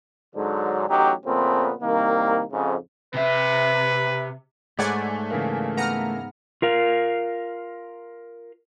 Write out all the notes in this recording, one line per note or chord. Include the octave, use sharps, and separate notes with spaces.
G#2 D3 F#3
A1 F#3 D#4 G4
A#2 C#3 F3 A3 B3 C4
C2 D#3 A#3
F2 G#2 C#3
C3 B4 E5
G#2 A3 C#5 D5 F#5 G#5
C#3 E3 A#3
B3 A#5 F6
F4 A#4 F5